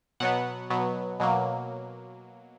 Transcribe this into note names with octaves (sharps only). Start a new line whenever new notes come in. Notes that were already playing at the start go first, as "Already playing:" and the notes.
B2 F#3 B3 F#5
B2 F#3 B3
B2 F#3 A#3